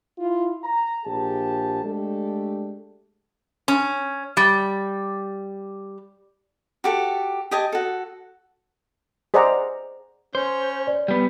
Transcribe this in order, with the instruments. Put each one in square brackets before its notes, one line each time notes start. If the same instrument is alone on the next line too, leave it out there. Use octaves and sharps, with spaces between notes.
[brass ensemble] E4 F4
A#5
A#1 G4 G#4 A5
G#3 A3 D4 G4 A4
[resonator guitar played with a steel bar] C#4
G3
[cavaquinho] F#4 G4 A4
G4 D#5 G#5 A5
F#4 A4
[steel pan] G#4 C5 D5 D#5 F#5 A#5
[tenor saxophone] C#4 [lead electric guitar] C5
[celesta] D5
[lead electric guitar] G3 B3